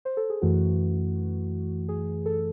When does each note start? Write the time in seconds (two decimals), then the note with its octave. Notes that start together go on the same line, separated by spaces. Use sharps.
0.05 C5
0.17 A4
0.30 G#4
0.42 F#2 E3 A3 F#4
1.89 G#4
2.26 A4